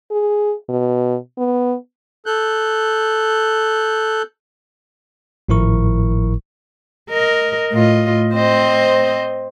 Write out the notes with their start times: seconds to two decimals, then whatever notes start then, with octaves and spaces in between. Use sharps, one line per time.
0.11 G#4
0.69 B2
1.38 B3
2.26 A4 F#6 G6
5.49 G#1 A2 F3 E4 A#4 C#6
7.10 A#4 D#5
7.72 A2 F4 D#5
8.35 C4 C5 D#5